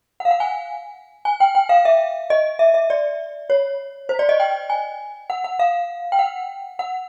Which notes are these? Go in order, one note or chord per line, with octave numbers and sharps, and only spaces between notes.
F#5
F5
F#5
G#5
G#5
G5
G5
F5
E5
D#5
E5
E5
D5
C#5
C5
D5
D#5
G5
G#5
F#5
F#5
F5
G5
F#5
F#5